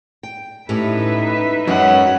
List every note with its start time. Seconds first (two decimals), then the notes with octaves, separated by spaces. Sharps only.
0.23 G5
0.69 A2 C#4 D#4 G4 B4 E5
1.67 F#3 G#3 C#4 F#5